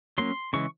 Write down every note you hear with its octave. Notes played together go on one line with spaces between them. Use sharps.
F#3 A#3 C#4 C6
C#3 E3 G#3 C#6